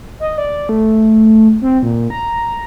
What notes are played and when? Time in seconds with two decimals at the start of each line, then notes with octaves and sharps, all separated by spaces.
0.20 D#5
0.38 D5
0.69 A3
1.62 C4
1.83 A#2
2.10 A#5